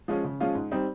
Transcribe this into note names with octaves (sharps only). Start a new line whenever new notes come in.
F3 G#3 C#4 F4
C#3
F3 G#3 C#4 F4
G#2
G3 C4 D#4